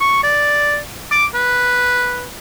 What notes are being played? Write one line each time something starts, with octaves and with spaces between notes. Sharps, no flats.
C#6
D5
D6
B4